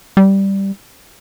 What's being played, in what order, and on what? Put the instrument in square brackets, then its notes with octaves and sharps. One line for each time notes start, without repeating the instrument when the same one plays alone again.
[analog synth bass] G3